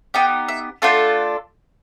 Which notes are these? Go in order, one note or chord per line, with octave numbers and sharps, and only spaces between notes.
B3 D#4 G4 G5
E5
A3 D4 F4 A4 F#5